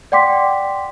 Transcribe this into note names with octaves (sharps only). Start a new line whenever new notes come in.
D5 F#5 G5 C6 D6 B6